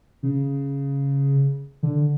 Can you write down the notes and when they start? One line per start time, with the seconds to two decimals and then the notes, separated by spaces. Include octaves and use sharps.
0.23 C#3
1.83 D3